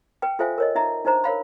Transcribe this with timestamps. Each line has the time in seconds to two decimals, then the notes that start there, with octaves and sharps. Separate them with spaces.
0.22 B4 G5
0.39 F4 A4 C5 E5 F5 G#5
0.58 A#4 C#5 D#5
0.75 D#4 E5 A#5
1.05 D4 D#4 C5 A#5
1.24 A#4 C#5 F5 B5